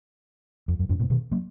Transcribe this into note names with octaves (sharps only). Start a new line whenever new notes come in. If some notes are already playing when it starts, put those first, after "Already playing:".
F2
F#2
F2 G#2
G#2 B2
B2 D#3
F#3 A#3